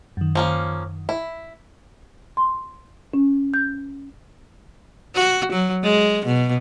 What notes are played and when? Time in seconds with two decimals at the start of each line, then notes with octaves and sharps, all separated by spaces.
0.17 F#2 D#3
0.35 F3 A#3 C#4
1.09 E4
2.37 C6
3.14 C#4
3.54 G6
5.15 F#4
5.52 F#3
5.84 G#3
6.26 B2